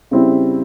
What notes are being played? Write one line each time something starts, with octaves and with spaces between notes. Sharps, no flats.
C#3 G3 C4 E4